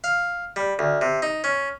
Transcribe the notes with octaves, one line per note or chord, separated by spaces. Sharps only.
F5
G3
D2
C3
D#4
C#4